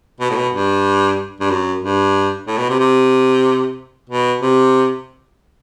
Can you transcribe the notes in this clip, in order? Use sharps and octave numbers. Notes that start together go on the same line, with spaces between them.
B2
A2
B2
G2
G2
F#2
G2
A2
B2
C3
C3
B2
C3